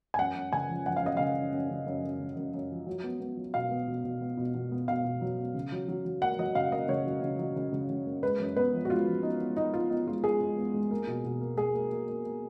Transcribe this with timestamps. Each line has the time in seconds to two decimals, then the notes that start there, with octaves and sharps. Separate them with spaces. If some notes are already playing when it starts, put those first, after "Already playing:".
0.14 G#5
0.19 F#2 F#5
0.36 F#2
0.52 C#3 G#5
0.69 F3
0.86 F3 F#5
0.97 F5
1.02 F#2 D#5
1.17 C#3 F5
1.36 F#2
1.52 F#2
1.70 C#3
1.87 F#2
2.03 F#2
2.20 C#3
2.37 F#2
2.54 F#2
2.70 F3
2.87 F#3
3.04 B3
3.20 B3
3.37 F#3
3.54 B2 F5
3.71 B3
3.87 B2
4.04 B2
4.21 B3
4.37 B2
4.54 B2
4.71 B3
4.88 B2 F5
5.04 B2
5.21 F#3
5.38 B3
5.55 C#3
5.72 F#3
5.88 F#3
6.05 F#3
6.22 A#3 F#5
6.39 F#3 D#5
6.55 C#3 F5
6.72 A#3 D#5
6.88 C#3 C#5
7.06 F#3
7.22 C#3
7.39 F#3
7.56 C#3
7.73 C#3
7.90 C#3
8.06 A#3
8.23 G#3 B4
8.40 F#2
8.56 B3 B4
8.73 F3
8.85 F#4
8.90 G#3 F4
9.07 F3
9.23 B3 D#4
9.41 B3
9.57 B3 D#4
9.74 B3 F4
9.90 B3 D#4
10.07 G#3 F4
10.24 G#3 G#4
10.41 G#3
10.57 B3
10.74 G#3
10.91 A#3
11.07 B2
11.24 B2
11.41 A#3
11.58 A#3 G#4
11.75 A#3
11.92 A#3
12.09 A#3
12.25 A#3